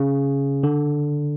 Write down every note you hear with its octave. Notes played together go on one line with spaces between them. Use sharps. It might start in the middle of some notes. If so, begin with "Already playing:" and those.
Already playing: C#3
D3